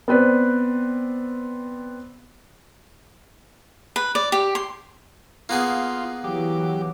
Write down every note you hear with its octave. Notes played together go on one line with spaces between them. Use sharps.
B3 C4 B4 D5
B4
D5
G4
C6
A#3 B3 F4 G#4
E3 F#3 G4 D6